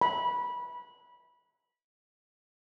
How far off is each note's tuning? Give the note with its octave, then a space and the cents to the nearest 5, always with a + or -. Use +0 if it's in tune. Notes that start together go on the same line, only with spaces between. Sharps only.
B5 -15